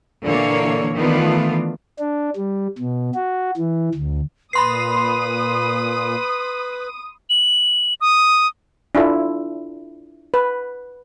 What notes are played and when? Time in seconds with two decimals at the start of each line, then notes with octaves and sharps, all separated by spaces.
0.24 A#2 D3 E3 A#3 C#5
0.97 D#3 E3 A3 B3 D4 F4
1.99 D4
2.36 G3
2.79 B2
3.15 F#4
3.57 E3
3.95 D2
4.53 A#2 B4 B5 C6 D#6 C7
7.30 F#7
8.01 D#6
8.95 D4 E4 F4 A4
10.34 B4